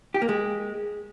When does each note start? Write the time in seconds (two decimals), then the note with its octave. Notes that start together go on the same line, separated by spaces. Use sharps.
0.14 G4
0.22 A#3
0.29 G#3